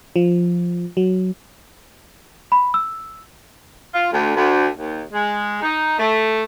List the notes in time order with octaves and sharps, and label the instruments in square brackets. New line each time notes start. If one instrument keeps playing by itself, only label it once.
[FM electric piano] F3
F#3
[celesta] B5
E6
[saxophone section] F4
D2
D2
D#2
G#3
D#4
A3